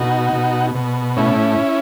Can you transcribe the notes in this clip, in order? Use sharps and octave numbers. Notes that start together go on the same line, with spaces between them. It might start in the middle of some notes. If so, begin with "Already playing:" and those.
Already playing: B2 D#4 F#4
B2
B2
A2 C#4 E4